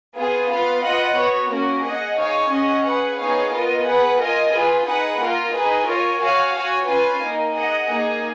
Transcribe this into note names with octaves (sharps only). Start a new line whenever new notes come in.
B3 F4 G#4
B3 F4 B4 F5
F4 B4 D#5 F#5
B3 F#4 C#5
A#3 C#4 F#4 A#4
G#4 D#5 F#5
D#4 G#4 C#5 F5 G#5
C#4 G#4 D#5 F#5
G#4 B4 F#5
B3 D#4 G#4 C#5 F5
B3 F4 A#4 D#5
G#4 B4 F#5
F4 A#4 D#5 G#5
F4 G#4 B4
D#4 G#4 B4 F#5
A#3 F4 A#4
D#4 G#4 B4 D#5
F4 A#4 C#5 G#5
F#4 C#5 F5 G#5
F#4 C#5 G#5
C#4 F4 B4 F5 G#5
A#3 D#4 A#4
G#4 D#5 F#5
A#3 D#4 G#4